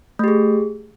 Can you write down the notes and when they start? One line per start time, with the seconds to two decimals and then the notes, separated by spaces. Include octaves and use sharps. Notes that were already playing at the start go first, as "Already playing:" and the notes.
0.19 A3
0.24 G4
0.28 G#4